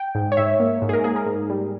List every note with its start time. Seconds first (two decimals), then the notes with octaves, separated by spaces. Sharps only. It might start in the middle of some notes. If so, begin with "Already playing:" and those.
Already playing: G5
0.15 G#2
0.32 C#5
0.37 G#2 E5
0.60 A#3
0.82 G#2
0.89 G#4
0.93 A#4
1.04 A#3 G#4
1.16 A#4
1.26 G#2
1.50 G3